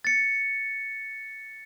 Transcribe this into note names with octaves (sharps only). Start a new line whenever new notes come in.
A6 C#7